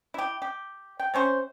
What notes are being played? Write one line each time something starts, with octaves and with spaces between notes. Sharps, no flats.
E4 G4
G4
G5
C3 C#4 C5 C#6